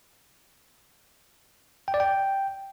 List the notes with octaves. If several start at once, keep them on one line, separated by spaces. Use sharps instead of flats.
G5
D5
G5